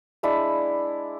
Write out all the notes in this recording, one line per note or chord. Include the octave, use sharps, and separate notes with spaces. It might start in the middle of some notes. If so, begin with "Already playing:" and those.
G#3 D4 E4 B5